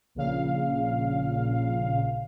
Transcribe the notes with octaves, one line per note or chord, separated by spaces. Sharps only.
A#1 A#2 C#3 F5